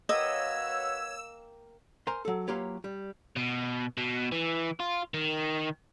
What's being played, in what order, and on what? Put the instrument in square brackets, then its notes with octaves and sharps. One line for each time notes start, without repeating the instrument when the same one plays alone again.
[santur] A#3 F5 G5 [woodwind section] F#4 B4 C#5 [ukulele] D#5 [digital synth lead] E6
[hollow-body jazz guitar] A#4 C5 G#5 A#5 C6
F#3 A4
F#3 A#3 F4 G4 B4 C#5
G3
[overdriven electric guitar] B2
B2
E3
F4
D#3